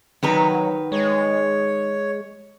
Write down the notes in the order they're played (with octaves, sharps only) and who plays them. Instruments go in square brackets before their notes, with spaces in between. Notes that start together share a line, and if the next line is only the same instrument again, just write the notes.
[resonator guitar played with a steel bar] D#3 B4 A#5 [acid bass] F#3
[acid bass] G#3 [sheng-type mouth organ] C#5